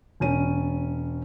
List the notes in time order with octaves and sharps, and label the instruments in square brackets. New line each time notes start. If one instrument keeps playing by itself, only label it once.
[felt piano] E1 C#4 D#7